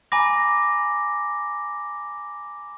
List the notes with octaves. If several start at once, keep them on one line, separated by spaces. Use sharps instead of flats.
G#5 A#5 B5 D6 A#6